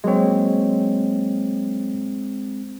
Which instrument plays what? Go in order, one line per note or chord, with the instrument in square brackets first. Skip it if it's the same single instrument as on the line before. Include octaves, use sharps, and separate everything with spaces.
[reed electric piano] F#3 A#3 C#5 [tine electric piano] G#3 C4